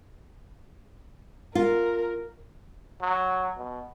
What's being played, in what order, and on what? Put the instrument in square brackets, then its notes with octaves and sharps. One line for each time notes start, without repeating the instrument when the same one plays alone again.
[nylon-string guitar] F4 [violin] A#4
[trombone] F#3
B2